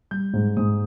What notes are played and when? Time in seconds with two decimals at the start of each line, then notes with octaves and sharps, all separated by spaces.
0.11 G3 G6
0.33 G#2
0.57 G#2 D#6